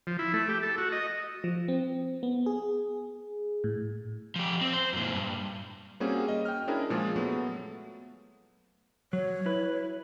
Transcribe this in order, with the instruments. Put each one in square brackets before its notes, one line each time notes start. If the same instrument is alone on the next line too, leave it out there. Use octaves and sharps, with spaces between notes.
[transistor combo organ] F3
E4
A3
G4
A4
F#4
D#5
[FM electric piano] F3
C4
B3
G#4
A2
[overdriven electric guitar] F3 G4
C4
C5
F#2 A#2
G2
[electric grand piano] G3 A#3 C4 C#4 F#4 G#4
D#5
G5 F6
C#4 D4 E4 G#4 A#4
A#2 F3 G#3 G#4
F#3 A3 B3
[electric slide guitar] F#3 [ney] C#5
[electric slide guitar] E4 B4